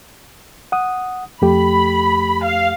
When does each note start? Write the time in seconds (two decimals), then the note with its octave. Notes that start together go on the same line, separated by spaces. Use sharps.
0.72 F#5 D#6
1.42 F2 A3 G4 B5
2.44 F5